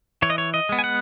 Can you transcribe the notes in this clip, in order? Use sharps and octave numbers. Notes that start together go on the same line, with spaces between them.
E3 C#5
D#5
C#5
D#5
G#3 B3
G#5
F#5